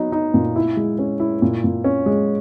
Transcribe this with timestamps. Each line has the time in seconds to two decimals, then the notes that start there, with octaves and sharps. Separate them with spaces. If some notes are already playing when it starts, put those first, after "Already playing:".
Already playing: F#3 B3 D#4
0.12 D#4
0.34 A#2
0.56 E4
0.77 G#3
0.99 C#4
1.20 E4
1.42 A#2
1.64 A#2
1.84 C#4
2.06 G#3